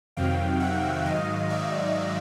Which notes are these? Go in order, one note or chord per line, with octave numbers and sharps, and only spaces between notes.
F2 C3 D#3 F#3 F5 G5
E5 F#5
G#2 D#3 F#3 D#5 F5
D5 E5